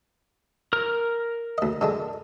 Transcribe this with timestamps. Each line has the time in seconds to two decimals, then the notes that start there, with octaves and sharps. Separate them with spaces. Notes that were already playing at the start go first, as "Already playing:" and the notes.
0.73 A#4 F6
1.58 D2 D#5
1.81 D3 G#3 D4